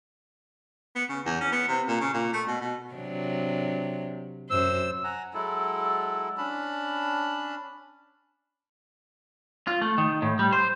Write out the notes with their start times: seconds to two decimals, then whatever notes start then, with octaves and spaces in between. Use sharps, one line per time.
0.96 B3
1.09 C#3
1.26 E2
1.41 C#4
1.53 B3
1.68 C3
1.88 A#2
2.01 C#3
2.14 A#2
2.34 A3
2.48 B2
2.61 B2
2.94 C3 F#3 D4
4.51 F#2 C5 E6
5.04 F#5 G#5 A#5
5.34 F#3 G#3 E4 A4
6.38 C#4 D4 A5 B5
9.67 F4
9.81 A3
9.98 D#3
10.22 A2
10.39 G3
10.52 C5